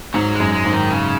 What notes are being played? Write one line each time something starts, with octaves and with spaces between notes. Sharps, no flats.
G#2 F#3
G#3
F#2
G#3
G#2
D#3
C#3